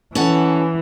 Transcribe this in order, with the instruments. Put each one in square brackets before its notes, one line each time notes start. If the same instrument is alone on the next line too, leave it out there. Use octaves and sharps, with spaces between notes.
[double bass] E3 [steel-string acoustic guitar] C#4 A4 F#5